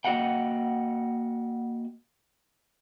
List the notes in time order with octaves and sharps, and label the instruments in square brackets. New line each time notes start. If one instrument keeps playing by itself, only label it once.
[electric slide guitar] A#3 F#4 D#5 F#5 G5